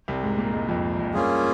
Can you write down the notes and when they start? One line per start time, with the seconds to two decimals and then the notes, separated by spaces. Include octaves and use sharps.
0.08 C2 C3
0.23 G#2 G#3
0.38 A#2 A#3
0.53 G#2 G#3
0.68 F2 F3
0.99 F2
1.14 G2 A#3 C#4 F4 G#4